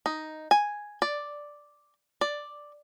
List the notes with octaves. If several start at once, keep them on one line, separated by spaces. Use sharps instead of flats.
D#4
G#5
D5
D5